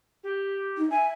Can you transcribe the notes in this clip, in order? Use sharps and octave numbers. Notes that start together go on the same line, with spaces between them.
G4
D#4
E5 G#5